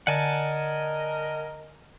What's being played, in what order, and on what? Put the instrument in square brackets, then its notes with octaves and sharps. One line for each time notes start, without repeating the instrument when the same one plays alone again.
[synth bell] D3 D5 [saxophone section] A#4 D#5 [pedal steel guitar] F#5 G#5 A5